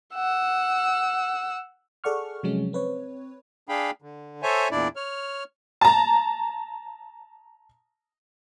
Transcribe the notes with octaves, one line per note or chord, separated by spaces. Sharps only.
F#5 E6
G#4 A4 D5 F#5 C#6 F6
C3 F3 F#3 G#3 C#4
C4 B4 C#5
D4 G#4 F5 G5 B5
D3
A4 C5 C#5 E5 G#5
E2 A#2 D4 E4 D5
C#5 F6
A5 A#5